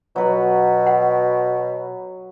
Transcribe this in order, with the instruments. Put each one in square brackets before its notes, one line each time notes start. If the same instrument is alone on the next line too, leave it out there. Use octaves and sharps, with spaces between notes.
[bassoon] B2 [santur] F#3 B4
[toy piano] F#5